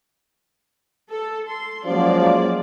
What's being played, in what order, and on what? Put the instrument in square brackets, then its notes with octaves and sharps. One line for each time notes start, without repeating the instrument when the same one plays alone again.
[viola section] A4
C6
[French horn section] F3 F#3 C#4 [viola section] G#3 A#3 D5